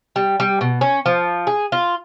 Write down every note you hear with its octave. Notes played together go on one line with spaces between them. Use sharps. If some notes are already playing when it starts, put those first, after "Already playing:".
G3
G3
B2
C#4
F3
G#4
F4